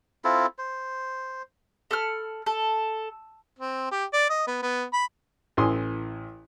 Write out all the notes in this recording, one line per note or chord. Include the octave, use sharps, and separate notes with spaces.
C4 E4 F4 A4
C5
A4 B5 F6
A4
C4
G4
D5
D#5
B3
B3
B5
A1 E3 G#5 C6 D#6